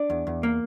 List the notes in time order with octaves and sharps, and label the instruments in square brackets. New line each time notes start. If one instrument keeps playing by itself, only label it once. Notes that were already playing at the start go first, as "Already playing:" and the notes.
Already playing: [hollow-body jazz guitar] D4 D5
E2
E2
A#3